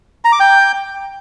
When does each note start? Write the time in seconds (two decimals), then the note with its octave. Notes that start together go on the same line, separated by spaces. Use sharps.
0.25 A#5
0.32 D6
0.40 G5